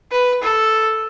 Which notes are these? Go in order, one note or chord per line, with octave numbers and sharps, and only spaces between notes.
B4
A4